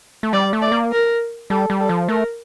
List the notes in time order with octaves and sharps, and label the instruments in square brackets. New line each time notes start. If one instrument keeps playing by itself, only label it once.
[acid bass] A3
[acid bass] G3 [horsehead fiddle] D5
[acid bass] A3
[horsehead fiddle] D5
[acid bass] A#3
[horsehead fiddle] A#4
[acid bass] G3 [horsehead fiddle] A4
[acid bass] G3
[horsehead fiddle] A4
[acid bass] F3
[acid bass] A3 [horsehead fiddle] A#4